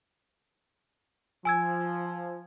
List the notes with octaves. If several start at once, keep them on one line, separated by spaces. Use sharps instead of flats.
F3 G#5 E6 G#6